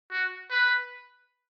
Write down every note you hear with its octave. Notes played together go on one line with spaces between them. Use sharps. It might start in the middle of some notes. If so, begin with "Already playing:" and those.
F#4
B4